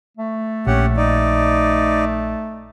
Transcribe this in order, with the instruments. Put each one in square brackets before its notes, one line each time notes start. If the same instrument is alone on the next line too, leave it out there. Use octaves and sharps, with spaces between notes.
[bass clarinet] A3
[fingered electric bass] A#1 [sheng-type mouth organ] C#4 G4 F#5
[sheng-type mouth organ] D#4 D5